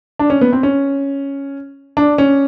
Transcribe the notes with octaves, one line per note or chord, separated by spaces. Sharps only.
D4
C#4
B3
C4
C#4
D4
C#4